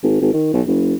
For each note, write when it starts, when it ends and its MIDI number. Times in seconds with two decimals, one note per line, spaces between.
0.03 0.20 32
0.21 0.33 32
0.33 0.52 51
0.53 0.61 35
0.67 0.94 30